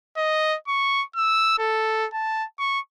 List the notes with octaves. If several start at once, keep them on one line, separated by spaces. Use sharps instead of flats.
D#5
C#6
E6
A4
A5
C#6